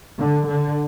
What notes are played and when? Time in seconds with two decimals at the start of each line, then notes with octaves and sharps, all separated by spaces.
0.18 D3
0.48 D3